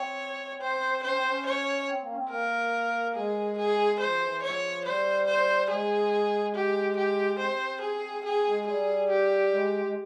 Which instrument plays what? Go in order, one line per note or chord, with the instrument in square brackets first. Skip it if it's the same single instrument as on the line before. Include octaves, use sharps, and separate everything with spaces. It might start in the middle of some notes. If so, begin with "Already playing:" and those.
Already playing: [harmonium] C4 [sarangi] C#5
[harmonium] C4 [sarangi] C5
[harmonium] C#4 [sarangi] C5
[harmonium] C4
C#4
[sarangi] C#5
[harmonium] C4
A#3
C#4
C4
[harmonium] A#3 [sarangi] A#4
[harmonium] G#3 [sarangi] G#4
[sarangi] G#4
[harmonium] F3 [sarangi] C5
[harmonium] E3
[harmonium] F3 [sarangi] C#5
[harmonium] G3 [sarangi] C5
[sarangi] C5
[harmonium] G#3 [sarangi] G#4
[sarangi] G4
G4
[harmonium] C4 [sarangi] C5
[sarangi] G#4
[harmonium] C4 [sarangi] G#4
[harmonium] G#3
[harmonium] G3 [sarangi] G#4
[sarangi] G4
[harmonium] G#3
G#3